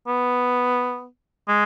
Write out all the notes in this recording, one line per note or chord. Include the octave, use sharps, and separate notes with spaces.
B3
G#3